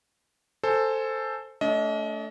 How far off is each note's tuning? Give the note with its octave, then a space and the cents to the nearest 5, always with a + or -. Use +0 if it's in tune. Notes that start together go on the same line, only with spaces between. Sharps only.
A4 +10 C5 +0 G#5 +15
A3 +0 D4 -40 D#5 +25